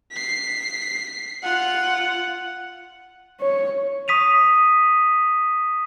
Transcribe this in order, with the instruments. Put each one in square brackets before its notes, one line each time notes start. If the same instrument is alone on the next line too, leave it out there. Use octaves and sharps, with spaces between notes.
[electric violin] B6 C7
[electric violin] F4 [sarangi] F#5
[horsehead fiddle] C#5
[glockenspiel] C#6 D#6 B6 D#7 F7